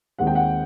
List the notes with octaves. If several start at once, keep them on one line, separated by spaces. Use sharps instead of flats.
D#2 D#3 G#3 C4 F#5
G5
F#5